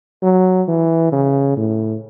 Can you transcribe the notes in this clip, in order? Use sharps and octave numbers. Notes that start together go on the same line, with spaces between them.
F#3
E3
C#3
A2